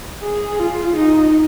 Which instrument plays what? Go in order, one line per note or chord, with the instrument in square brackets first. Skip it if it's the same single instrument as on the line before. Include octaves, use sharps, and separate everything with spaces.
[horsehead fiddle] G#4
F4
D#4